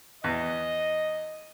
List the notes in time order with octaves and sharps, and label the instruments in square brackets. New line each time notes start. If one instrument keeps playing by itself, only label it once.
[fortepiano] E2 [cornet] D#5